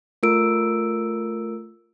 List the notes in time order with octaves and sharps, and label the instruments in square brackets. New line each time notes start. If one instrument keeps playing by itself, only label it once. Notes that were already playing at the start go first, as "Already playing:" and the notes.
[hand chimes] A3 F4 A#4 E6 D7